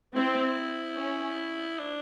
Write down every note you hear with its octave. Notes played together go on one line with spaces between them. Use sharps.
C4 E4
C#4
D4